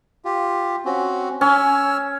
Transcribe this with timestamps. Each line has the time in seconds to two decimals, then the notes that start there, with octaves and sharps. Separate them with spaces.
0.25 F4 G4
0.85 C4 C#4 F#4
1.41 C#4 G#5 E6 F6